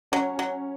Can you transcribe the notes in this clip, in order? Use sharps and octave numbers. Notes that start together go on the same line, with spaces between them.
F#3 C#4
F#3